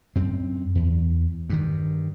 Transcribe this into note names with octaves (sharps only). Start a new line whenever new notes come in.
F#2 C4
E2
G2 D#3